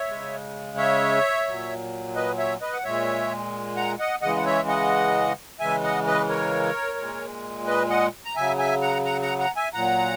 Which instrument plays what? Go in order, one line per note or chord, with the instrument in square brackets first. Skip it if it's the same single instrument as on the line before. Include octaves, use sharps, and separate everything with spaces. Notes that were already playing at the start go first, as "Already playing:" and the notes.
Already playing: [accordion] C#5 E5
C#3 G#3
C#5 E5
A#2 F#3
B4 D#5
C#5 E5
B4 D#5
F#5
A#2 G#3 C#5 E5
F#5 A#5
D#5 F#5
C#3 E3 G#3 D#5 F#5
F#5
C#5 E5
D#5 F#5
C#3 E3 G#3 E5 G#5
D#5 F#5
B4 D#5
A#4 C#5
A#2 G#3
B4 D#5
D#5 F#5
A#5
C#3 F#3 E5 G#5
E5 G#5
F#5 A#5
F#5 A#5
F#5 A#5
F#5 A#5
E5 G#5
A#2 F#3 F#5 A#5